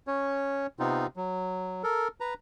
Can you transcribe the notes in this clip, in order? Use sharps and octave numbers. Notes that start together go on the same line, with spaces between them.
C#4 C#5
C3 B3 C4 D#4 F4
F#3
A4 A#4
B4 A#5